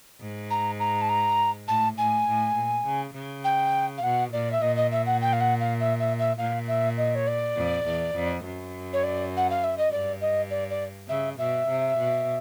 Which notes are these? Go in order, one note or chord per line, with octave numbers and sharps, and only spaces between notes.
G#2
A#5
A#5
A5
A#5
A2 A5
A2 G#5
A2
A#2
C#3
C#3
G5
F5
B2 F#5
A#2 D5
E5
A#2 D#5
D#5
E5
F#5
G5
F5
F#5
F5
E5
E5
E5
A#2 F5
E5
D#5
C#5
D5
F2
E2
F2
F#2
C#5
D5
F#5
F5
E5
D#5
G2 D5
D#5
D5
D5
C#3 E5
B2 E5
C3
B2